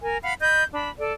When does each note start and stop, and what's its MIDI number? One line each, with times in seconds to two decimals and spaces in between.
0.01 0.17 70
0.01 0.17 80
0.22 0.34 77
0.22 0.34 78
0.22 0.34 83
0.40 0.63 75
0.40 0.63 83
0.40 0.63 91
0.72 0.88 62
0.72 0.88 83
0.98 1.12 69
0.98 1.12 74